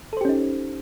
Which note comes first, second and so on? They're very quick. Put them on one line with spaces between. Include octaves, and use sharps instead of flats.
A4 C5 G4 C#4 D#4